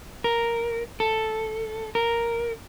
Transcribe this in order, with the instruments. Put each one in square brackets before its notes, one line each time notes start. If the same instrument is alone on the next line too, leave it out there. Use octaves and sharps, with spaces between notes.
[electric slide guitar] A#4
A4
A#4